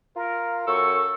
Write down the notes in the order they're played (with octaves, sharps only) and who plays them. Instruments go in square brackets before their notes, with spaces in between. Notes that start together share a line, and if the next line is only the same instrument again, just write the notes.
[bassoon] F4 [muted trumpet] A#4
[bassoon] F#2 [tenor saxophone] A4 [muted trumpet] C#6